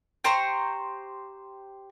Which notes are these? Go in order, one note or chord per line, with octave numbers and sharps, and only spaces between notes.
G4 C5 A#5 C#6